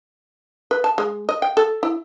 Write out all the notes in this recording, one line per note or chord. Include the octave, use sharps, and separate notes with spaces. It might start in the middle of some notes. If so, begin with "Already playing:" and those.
B4
A5
G#3
D#5
G5
A4
E4